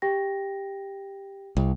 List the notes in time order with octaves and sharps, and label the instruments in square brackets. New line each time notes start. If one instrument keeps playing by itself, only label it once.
[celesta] G4 G5 A#6
[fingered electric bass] C2